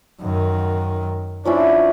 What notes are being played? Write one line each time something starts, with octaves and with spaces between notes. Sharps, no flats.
F#2 D#3
F3 C#4 D4 E4